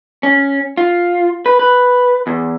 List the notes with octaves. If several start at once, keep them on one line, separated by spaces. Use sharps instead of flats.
C#4
F4
B4
B4
E2